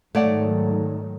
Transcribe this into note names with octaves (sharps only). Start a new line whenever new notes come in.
G#2 D#3 F#3 A3 C#5 D5 F#5